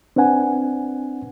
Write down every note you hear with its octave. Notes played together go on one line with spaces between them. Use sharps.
C4 D4 B4 F#5 G#5